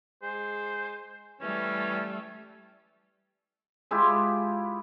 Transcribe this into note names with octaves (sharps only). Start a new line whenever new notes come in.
G#3 C5
E3 G3 A3 C#4
G#3 E4 F4 G4